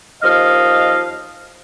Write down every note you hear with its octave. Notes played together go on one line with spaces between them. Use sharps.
D#2 F3 D#5 F5